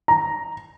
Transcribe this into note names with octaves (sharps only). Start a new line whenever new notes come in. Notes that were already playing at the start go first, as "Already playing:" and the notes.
A#5